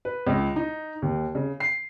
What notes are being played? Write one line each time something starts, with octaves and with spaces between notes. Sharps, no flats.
B4
C#2
D#4
D#2
C#3
C7